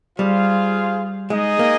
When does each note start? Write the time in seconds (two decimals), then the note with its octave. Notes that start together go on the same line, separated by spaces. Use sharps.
0.19 G3 F4 G#4 C5 F5
1.30 G#3 D#4 G#4 D#5
1.59 A#3